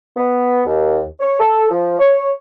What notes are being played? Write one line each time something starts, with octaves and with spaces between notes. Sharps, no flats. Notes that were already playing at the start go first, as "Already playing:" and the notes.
B3
D#2
C#5
A4
F3
C#5